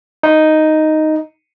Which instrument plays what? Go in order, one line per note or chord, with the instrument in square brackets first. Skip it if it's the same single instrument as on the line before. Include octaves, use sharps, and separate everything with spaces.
[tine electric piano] D#4